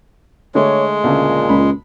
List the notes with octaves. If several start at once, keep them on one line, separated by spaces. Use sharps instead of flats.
D3 G#3 A3 C#5
D2 A#2 C#3
C#2 B5